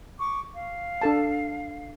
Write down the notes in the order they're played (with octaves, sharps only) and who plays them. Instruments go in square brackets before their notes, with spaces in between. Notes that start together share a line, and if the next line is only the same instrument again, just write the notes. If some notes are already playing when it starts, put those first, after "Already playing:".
[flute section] C#6 D6
F5
[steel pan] D4 A4 A5